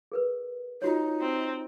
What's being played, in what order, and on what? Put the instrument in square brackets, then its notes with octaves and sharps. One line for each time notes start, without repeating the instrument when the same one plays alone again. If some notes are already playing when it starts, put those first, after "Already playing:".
[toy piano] G#4 A#4 B4
[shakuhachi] D#4 [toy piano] F4 F#4 C#5
[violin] C4